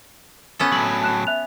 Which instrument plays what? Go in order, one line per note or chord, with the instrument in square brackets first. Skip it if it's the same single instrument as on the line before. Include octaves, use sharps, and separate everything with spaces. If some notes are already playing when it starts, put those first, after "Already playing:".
[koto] B3 C#4 A4
[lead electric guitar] A2 F#3 [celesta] F#7
[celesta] A5 F#6 E7
E5 F#6 F7